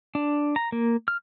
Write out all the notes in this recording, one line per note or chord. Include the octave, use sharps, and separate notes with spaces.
D4
A#5
A#3
F6